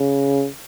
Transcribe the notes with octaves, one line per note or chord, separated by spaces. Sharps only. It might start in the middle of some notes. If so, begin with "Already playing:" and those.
Already playing: C#3